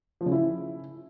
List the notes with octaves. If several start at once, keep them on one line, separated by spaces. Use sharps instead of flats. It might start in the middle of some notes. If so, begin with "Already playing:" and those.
F3
C#3
E4